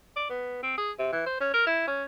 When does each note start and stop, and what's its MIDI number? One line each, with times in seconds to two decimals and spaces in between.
0.16 0.25 74
0.30 0.60 59
0.63 0.74 60
0.78 0.92 68
0.99 1.12 48
1.13 1.22 52
1.26 1.40 72
1.40 1.50 61
1.54 1.66 70
1.67 1.83 64
1.87 2.04 61